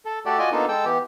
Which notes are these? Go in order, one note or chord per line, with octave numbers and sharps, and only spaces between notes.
A4
A3 F#4 G4 A4 D5
F4 F#4 D5 D#5 G#5
A#3 B3 D4 D#4 F4 A4
G#3 A4 G5 E6
E3 B3 G4